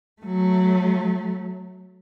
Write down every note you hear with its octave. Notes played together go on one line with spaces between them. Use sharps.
F#3 A3